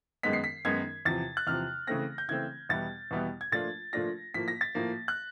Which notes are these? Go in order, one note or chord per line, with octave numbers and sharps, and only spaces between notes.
F#2 D#3 G#3 B3 D#4 B6
C7
B6
F#2 D#3 G#3 B3 D#4 G#6
E2 C3 F3 A6
F#6
E2 C3 F3 F6
C#3 E3 A3 C4 A#6
G6
C#3 E3 A3 C4 G#6
E2 B2 G3 B3 E4 A6
E2 B2 G3 B3 E4
G#6
A#2 F3 A3 D4 F4 A6
A#2 F3 A3 D4 F4 A#6
A2 F3 A#3 B6
A#6
A6
A2 F3 A#3
F#6